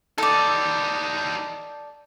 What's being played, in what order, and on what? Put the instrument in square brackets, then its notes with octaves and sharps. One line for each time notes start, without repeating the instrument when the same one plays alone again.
[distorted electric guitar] D#4 G4 [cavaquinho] A4 D5